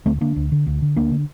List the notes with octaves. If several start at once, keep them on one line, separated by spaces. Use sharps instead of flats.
D2 A3 C4
D3 A#3 D4
D2
D3
D2
D3
D2 A#3 D4
D3